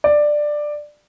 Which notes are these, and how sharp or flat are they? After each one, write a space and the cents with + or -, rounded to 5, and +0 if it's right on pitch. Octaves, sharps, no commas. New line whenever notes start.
D5 +10